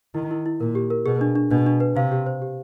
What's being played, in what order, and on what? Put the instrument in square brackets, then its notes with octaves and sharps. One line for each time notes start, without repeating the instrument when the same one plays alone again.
[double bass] D#3 [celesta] E4
[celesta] E4
E4
[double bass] A#2 [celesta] A#4
[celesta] G4
A#4
[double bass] B2 [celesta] G#4
[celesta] D4
D4
[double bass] B2 [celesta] D4
[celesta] D4
B4
[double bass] C3 [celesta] F5
[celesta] G4
C5
G4